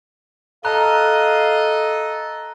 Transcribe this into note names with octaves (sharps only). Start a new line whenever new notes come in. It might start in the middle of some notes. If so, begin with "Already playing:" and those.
A4 D#5 F5 A5 A#5 F#6